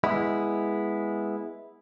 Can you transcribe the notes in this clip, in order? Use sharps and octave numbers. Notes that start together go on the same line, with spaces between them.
G#3 B3 E4